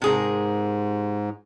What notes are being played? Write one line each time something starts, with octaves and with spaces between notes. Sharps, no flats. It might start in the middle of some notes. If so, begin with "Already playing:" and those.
G#2 C3 G#4 A#4